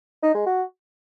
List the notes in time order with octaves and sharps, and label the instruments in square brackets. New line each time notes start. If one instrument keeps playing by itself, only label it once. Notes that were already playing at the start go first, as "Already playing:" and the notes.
[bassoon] D#4
G#3
F#4